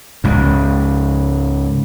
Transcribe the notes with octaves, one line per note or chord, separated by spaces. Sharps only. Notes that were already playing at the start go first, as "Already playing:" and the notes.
C#2 G#2